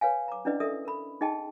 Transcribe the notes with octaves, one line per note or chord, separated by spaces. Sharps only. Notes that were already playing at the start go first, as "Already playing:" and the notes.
B4 C#5 F5 G#5
A#5 D6
C#4 D4 E4 B4 D5 D#5
A4 A#4 D5 E5 D#6
A#4 B5
D#4 G#4 D#5 G5 A5